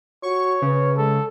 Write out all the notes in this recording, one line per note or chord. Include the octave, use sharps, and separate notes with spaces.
F#4 C#5 C#6
C#3 B4
G#3 A4